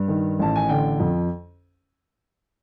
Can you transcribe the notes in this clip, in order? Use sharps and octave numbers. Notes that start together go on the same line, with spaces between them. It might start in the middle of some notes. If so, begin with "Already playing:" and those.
Already playing: G2
D#3
A1 A5
G#5
D3 G5
F2